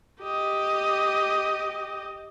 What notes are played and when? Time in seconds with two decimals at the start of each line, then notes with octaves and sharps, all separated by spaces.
0.22 G4 D#5